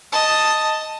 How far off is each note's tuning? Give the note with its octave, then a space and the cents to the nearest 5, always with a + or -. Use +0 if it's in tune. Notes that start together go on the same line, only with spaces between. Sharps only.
D#5 +0 A5 +0